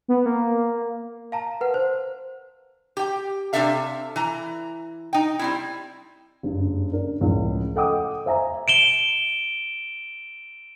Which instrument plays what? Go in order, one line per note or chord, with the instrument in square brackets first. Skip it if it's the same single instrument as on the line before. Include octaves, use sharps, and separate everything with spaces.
[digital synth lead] B3
A#3
[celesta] F5 A5 A#5
A#4 B4 F#5
C5
[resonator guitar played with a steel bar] G4 G5
C3 A#3 D4 A4 E5 F5
E3 A#5
D#4 G5
G3 C4 E4
[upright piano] F#1 G2
D4 A#4
C#2 A2 F3
A4 D#5 F#5 G5 D6 D#6
C5 E5 G#5 A#5
[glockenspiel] D7 E7 G7